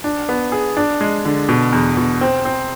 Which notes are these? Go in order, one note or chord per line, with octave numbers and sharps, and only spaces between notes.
D4
B3
G#4
D4
G#3
D3
B2
E2
B2
C4
C4